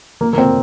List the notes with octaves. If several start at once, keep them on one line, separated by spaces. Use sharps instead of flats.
A#3
A#3
C4